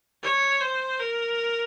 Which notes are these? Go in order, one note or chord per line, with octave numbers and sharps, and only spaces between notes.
C#5
C5
A#4